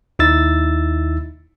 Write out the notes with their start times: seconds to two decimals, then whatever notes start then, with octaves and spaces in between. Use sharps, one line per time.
0.19 D#2 D#4 E4 E6 A6